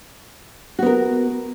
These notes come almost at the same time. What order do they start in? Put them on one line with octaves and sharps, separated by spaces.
F#4 B3 A#4